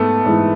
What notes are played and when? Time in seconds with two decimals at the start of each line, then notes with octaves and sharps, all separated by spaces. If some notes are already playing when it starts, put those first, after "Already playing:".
Already playing: G#2 A3 B3
0.25 G#2 E3